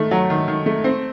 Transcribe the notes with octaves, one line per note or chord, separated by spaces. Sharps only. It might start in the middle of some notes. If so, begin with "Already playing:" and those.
Already playing: D#3 A3
F#3
D#3
D#3
A3
C4